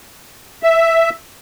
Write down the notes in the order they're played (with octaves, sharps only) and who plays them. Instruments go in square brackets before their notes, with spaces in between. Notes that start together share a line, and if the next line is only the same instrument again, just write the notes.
[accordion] E5